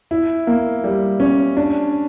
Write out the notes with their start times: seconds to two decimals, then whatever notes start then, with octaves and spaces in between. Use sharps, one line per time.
0.11 E4
0.47 A#3
0.84 G3
1.20 C#4
1.57 D4